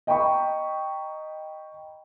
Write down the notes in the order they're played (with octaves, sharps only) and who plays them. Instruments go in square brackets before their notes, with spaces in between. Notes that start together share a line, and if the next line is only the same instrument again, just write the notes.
[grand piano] D#5 G5 A#5 B5 C#6